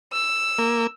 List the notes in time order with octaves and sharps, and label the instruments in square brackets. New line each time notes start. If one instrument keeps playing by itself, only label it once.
[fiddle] E6
[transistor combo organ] A#3